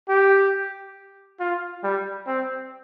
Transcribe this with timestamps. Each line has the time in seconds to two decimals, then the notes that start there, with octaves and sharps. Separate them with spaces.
0.09 G4
1.40 F4
1.83 G3
2.27 C4